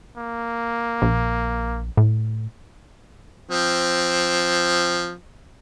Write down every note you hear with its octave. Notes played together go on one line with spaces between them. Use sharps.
A#3
A#1
A2
F3 C4